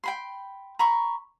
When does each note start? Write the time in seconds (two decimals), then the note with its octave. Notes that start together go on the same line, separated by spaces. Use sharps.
0.04 G5 B5 C6
0.79 A#5 B5 C#6